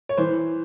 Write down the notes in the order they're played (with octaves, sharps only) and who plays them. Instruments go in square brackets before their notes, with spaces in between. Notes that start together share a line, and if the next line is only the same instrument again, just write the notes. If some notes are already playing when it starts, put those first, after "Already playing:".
[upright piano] C#5
E3 C5